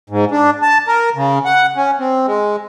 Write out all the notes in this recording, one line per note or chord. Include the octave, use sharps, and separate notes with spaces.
G#2
D4
A5
A#4
C#3
F#5
C#4
C4
G#3